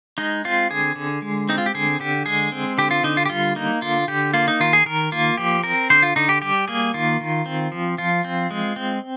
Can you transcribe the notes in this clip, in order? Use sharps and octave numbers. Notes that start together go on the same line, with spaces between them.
G#3 D#4
C4 F4
D3 G#4
D3
G#3
C4 D#4
F4
G4
D3 G#4
D3 G4
G#3 G#4
C4
D3 G4
F4
D3 D#4
F4
G4
G3 F4
A#3 D#4
D3 F4
D3 G4
A#3 F4
D#4
D#3 F4
G#4
D#3 A#4
A#3 F4
F3 G4
C4 A#4
D3 C5
F4
D3 D#4
G4
G3 G4
A#3 G#4
D#3 F4
D#3
C4
F3
F3 F4
C4
G#3
C4